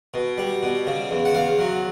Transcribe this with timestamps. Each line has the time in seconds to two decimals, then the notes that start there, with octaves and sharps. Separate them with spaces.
0.14 B2
0.38 G3
0.63 B2
0.87 C#3
1.11 E2
1.25 F#5
1.34 E2 F5
1.59 F#3